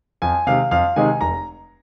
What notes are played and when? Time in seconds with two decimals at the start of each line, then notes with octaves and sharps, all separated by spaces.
0.22 F2 G#5
0.47 C3 D#3 G#3 D#4 F5
0.71 F2 F5
0.96 C3 D#3 G#3 D#4 G#5
1.21 F1 A#5